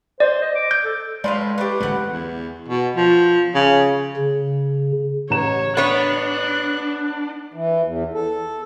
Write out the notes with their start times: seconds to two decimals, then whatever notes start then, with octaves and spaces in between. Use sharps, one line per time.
0.20 C5 D5
0.42 D#5
0.55 D6
0.71 G6
0.84 A4
1.24 A2 G#3 B4 D5 F5 C6
1.58 A3 G4 B4
1.80 A1 D3 G#3 A4 F#5
2.12 E2
2.69 B2
2.96 F3
3.55 C#3
4.17 C#3
5.30 A1 C#5 A#5 E7
5.77 B3 D4 C#5 F#6
7.54 E3
7.84 E2
8.14 A4